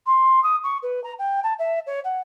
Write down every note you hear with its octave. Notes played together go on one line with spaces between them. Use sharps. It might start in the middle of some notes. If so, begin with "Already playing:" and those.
C6
D#6
C#6
B4
A#5
G5
A5
E5
C#5
F#5